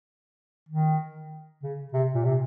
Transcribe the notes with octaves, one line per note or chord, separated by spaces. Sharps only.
D#3
C#3
C3
A#2
C3